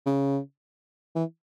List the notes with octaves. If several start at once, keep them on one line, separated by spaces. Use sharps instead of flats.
C#3
E3